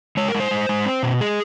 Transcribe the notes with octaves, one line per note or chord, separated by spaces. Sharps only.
G#3 C#5
A#4
G#3
C5
G#3
G#3
C4
B2
G#3 G#4